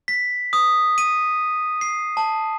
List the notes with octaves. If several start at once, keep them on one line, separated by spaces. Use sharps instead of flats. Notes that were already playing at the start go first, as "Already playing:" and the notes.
B6
D#6
D#7
C7
A5